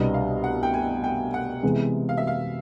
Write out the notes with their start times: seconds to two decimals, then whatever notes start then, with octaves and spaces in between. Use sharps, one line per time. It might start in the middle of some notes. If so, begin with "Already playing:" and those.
Already playing: C2 B2 G3 B3 D4 D#5
0.14 F5
0.44 F#5
0.63 G5
0.74 G#5
1.04 G5
1.34 F#5
1.63 C3 E3 G#3 B3
2.09 F5
2.17 E5
2.27 F5